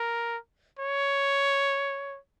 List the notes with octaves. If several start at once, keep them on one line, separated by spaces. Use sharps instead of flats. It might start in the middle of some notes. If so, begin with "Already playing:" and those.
Already playing: A#4
C#5